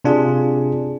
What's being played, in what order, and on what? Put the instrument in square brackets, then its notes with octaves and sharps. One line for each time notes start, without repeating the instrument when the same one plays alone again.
[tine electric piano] C3 D4 F4 G#4